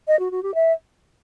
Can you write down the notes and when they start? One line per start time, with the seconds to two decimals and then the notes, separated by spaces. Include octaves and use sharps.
0.08 D#5
0.19 F#4
0.31 F#4
0.43 G4
0.55 E5